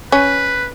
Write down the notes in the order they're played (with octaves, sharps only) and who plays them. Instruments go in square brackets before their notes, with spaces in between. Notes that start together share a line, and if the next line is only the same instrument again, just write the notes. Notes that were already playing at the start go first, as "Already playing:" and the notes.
[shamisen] C#4 [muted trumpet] B4